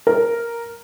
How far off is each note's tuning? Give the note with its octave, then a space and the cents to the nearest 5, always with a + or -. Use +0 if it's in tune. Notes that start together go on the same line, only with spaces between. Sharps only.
A#4 +0